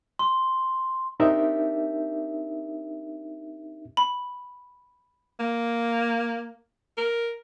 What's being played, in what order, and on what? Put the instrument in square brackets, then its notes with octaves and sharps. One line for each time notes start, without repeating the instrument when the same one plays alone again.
[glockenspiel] C6
[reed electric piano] C4 D4 D#4 G4 A#4 E5
[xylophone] B5
[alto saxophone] A#3
A#4